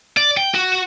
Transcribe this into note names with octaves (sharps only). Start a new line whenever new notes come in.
D5
G5
F#4